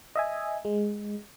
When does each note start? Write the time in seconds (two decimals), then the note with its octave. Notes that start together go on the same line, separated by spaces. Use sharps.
0.16 D#5 E5 G#5
0.65 G#3